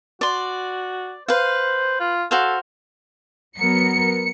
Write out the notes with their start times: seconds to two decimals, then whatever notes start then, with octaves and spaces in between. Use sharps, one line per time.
0.21 F#4 D5 C6
1.28 B4 C5 F5
2.00 F4
2.31 F#4 A4 C5 F5
3.58 F#3 B3 A#4 C#7